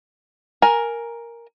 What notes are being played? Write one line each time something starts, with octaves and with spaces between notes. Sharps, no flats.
A#4 G#5